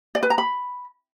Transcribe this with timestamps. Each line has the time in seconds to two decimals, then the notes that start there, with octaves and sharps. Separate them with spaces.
0.15 D5
0.23 B4
0.30 A#5
0.38 B5